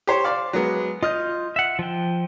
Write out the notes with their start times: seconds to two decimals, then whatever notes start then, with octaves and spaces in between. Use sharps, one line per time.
0.07 G4 C5 C#5
0.25 C5 D5 F5
0.53 F#3 G#3 B3
1.03 F4 D#5 F6 G6
1.56 E5 F#5
1.79 F3 G5